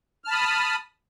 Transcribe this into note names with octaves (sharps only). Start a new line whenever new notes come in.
A5 B5 D#6 F6